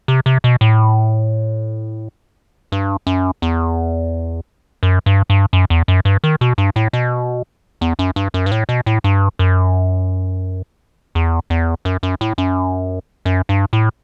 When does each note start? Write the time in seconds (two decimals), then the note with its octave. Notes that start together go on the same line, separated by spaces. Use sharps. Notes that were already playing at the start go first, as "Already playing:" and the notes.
0.08 C3
0.26 C3
0.44 B2
0.61 A2
2.72 G2
3.07 F#2
3.42 E2
4.83 F#2
5.06 G2
5.30 G2
5.53 F#2
5.70 E2
5.88 F#2
6.05 G2
6.24 D#3
6.41 B2
6.58 G2
6.76 A2
6.93 B2
7.81 E2
7.99 F#2
8.16 G2
8.34 F#2
8.46 G2
8.52 A2
8.69 B2
8.86 A2
9.04 G2
9.39 F#2
11.15 E2
11.50 E2
11.85 F#2
12.03 F#2
12.21 A2
12.38 F#2
13.25 F#2
13.49 G2
13.73 A2